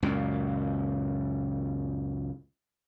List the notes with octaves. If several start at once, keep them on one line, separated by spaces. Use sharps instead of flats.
C#2 F#2 A#2